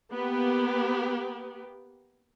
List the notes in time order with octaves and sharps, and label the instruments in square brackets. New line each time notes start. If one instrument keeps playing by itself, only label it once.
[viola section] A#3 B3 G4